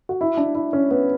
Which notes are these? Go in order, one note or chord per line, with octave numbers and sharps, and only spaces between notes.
F#4
E4
D4
E4
C#4
B3